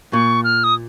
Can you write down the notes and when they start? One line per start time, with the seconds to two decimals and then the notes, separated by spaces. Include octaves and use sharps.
0.13 A#2 C#6
0.44 F6
0.64 D#6